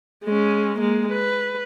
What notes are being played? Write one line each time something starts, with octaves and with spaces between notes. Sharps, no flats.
G#3 C#4
G#3 A#3
B4